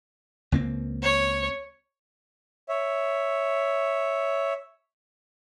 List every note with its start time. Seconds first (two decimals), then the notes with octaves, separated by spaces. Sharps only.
0.52 C#2 A#3 C4
1.02 C#5
2.69 C#5 E5